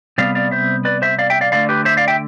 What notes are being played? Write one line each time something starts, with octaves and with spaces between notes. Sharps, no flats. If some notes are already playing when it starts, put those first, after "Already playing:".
C3 G3 B3 D5 F5
D5 F5
C5 E5
B4 D5
C5 E5
D5 F5
E5 G5
D5 F5
D3 A3 D5 F5
G4 B4
C5 E5
D5 F5
E5 G5